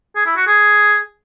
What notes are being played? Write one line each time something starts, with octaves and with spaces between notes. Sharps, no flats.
G#4
E4
F#4
G#4